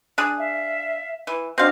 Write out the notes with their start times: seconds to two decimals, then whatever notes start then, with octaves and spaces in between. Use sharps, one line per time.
0.18 D4 G#4
0.38 E5 F5
1.27 E3
1.58 C4 D4 F#4 D#5 F5